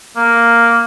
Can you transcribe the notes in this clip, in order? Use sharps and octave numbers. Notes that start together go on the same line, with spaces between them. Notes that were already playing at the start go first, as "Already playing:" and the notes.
A#3